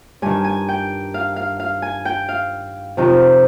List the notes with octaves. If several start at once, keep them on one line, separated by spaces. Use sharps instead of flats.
G2 D#3 G#5
G#5
G5
F5
F5
F5
G#5
G5
F5
F2 C3 D#3